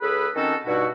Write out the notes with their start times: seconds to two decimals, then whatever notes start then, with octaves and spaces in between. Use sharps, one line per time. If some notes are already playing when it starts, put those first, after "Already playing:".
0.01 C#2 G#4 A4 B4
0.34 D#3 C4 C#4 F#4 A4
0.65 G2 B2 D#4 E4 F#4